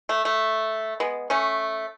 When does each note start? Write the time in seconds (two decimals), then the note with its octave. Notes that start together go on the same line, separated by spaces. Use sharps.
0.09 A3
0.25 A3
1.00 G#3 B3
1.30 A3 C#4